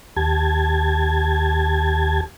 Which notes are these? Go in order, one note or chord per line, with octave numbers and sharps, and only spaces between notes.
D#2 G4 A5 G#6